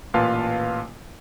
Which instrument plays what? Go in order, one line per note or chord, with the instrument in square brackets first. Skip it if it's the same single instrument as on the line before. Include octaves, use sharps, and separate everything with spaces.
[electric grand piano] A1 A#2 F4 B4 F5 A5